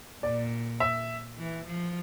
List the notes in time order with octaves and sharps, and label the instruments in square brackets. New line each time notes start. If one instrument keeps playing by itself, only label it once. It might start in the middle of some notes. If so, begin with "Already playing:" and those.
[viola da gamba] A#2 [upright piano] D5
[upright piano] E5
[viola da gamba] E3
F3